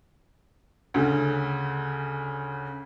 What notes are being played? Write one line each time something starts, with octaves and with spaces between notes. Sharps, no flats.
D2 C#3